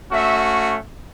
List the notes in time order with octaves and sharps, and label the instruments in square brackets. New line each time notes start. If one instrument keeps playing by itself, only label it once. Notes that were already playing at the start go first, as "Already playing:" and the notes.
[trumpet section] A3 C#4 F#4 E5